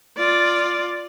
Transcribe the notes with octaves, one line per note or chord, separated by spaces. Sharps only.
F4 D5